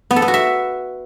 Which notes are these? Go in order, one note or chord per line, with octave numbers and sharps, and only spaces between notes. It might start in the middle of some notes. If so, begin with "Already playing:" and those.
B3
A4
B3
F#4
E5